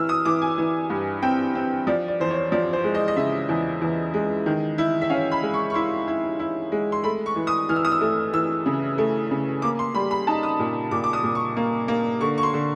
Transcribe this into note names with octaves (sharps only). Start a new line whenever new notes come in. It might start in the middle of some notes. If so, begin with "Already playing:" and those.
Already playing: E3 E6 F6
D#6
E3 D6
G#5
E3
G2
C4 G5
C4
F3 D5
D5
E2 C5
C#5
F3 D5
C5
G#3
D#5
D#5
C#3 E5
E2
E2
G#3
D#3
E4
E5
C#4 F5
B5
G#3
C#6
C#6
E4 C6
E4
E4
G#3
C6
A3 B5
C#6
E3
D#6
E3 F6
E6
D#6
E6
A3
E3 E6
C#3
A3
C#3
A#3 D6
C6
G3 B5
B5
D#4 A5
D#6
A#2
A#2 D6
D6
D#6
A#2
C#6
A#3
A#3
D3 C#6
C#6
C6
D3